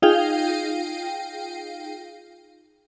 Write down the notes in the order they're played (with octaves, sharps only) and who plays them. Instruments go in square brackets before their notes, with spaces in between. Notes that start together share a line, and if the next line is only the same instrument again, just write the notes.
[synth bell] D#4 F4 G#4 F5 G5